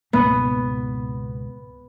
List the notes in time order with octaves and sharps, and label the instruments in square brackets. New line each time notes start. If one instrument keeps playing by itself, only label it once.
[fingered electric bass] C#2 G#2 B2 [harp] B3